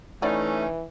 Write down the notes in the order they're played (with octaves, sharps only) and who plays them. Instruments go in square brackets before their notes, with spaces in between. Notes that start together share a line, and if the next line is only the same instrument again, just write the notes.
[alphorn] E3 [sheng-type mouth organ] A3 [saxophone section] C#4 D#4 [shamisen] E4 D5 G#5